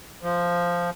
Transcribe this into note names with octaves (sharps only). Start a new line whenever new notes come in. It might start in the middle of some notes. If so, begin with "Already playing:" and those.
F3